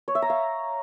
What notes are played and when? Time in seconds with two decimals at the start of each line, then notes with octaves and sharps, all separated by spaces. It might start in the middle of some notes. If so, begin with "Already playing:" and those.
0.08 C#5
0.15 E5
0.22 A#5
0.30 F5